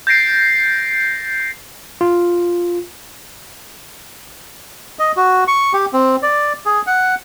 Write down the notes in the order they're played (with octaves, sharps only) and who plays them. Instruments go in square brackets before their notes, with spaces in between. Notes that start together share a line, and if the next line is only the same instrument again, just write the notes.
[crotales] G6 A6 A#6 C7 D7
[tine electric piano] F4
[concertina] D#5
F#4
C#6
G4
C4
D5
G#4
F#5